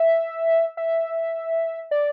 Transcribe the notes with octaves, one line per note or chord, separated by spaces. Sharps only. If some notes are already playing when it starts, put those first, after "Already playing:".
Already playing: E5
E5
D5